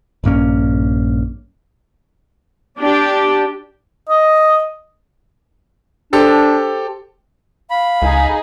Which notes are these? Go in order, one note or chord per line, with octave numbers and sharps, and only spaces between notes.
A#1 G2 A#3 C#4
D4 G4
D#5
D4 G4 A4 C5
F5 B5
C#2 D#4 G#4